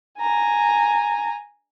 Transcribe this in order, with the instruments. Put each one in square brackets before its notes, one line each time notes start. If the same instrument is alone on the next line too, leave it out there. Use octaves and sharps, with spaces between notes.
[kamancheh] G#5 A#5